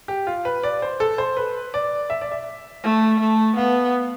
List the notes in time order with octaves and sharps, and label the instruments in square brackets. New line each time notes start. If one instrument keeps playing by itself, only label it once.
[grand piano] G4
F4
B4
D5
C5
A4
C5
B4
D5
E5
D5
E5
[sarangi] A3
A3
[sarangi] B3 [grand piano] F5